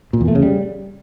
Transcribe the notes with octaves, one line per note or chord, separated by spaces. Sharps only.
A#2
E2
A3
C#3
G3